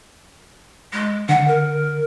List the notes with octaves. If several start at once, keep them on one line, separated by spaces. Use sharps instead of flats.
G#3
D3 F#5
A#4